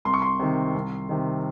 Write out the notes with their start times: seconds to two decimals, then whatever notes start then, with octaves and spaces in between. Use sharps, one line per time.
0.05 C2 C6
0.14 C#6
0.22 C6
0.39 C3 D#3
0.74 C2
1.09 C3 D#3